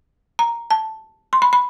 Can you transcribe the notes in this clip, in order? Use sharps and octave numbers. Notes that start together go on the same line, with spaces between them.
A#5
A5
C6
B5
B5